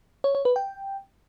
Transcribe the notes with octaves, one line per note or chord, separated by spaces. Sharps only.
C#5
C#5
B4
G5